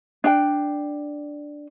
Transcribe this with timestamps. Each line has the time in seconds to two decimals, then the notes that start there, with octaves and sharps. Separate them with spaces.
0.24 D4 G5